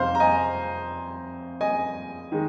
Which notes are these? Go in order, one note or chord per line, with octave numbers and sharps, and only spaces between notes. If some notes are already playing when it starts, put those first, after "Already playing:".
Already playing: F2 C3 D#4 C5 F5
A#5
D#5 G#5
D#5 G#5
D#3 G#3